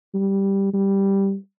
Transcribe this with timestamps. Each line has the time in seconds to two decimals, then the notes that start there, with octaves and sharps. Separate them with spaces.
0.14 G3
0.74 G3